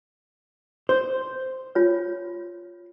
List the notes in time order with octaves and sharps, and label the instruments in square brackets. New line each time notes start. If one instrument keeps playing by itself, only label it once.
[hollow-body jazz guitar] C5
[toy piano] F4 C#5